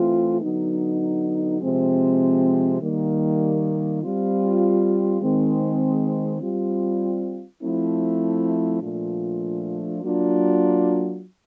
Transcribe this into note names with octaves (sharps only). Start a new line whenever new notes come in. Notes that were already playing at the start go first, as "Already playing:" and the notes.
Already playing: E3 A3 C4 F4
D3 F#3 B3 D#4
C3 F3 G#3 C4
D#3 G3 A#3
G3 C4 F4
D#3 G#3 C4
G3 C4 F4
F3 A3 C4 E4
A#2 F3 A3 D4 F4
F#3 A#3 D4 F4